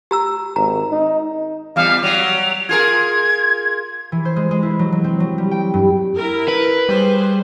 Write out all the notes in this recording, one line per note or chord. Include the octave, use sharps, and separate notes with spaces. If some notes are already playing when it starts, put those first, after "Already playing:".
G4 A#5 E6
G#1 A#5
D#4
E2 G3 F5
F#3 G3 F7
F4 G#4 A#4 G#6
E3
C5
G#3
G#3
E4
F#3
F#3
C4
F#3
G3
G5
G2
E4 A#4
B4
G3 G#4 C5